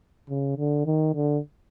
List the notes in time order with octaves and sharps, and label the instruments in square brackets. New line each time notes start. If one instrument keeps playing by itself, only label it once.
[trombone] C#3
D3
D#3
D3